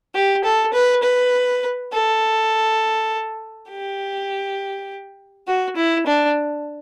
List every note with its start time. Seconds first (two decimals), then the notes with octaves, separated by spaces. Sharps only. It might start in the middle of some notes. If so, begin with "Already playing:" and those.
0.15 G4
0.44 A4
0.73 B4
1.03 B4
1.92 A4
3.70 G4
5.47 F#4
5.76 E4
6.06 D4